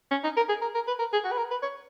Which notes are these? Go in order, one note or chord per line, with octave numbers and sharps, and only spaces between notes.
C#4
D#4
A#4
G#4
A#4
A#4
B4
A#4
G#4
F#4
B4
A#4
B4
C#5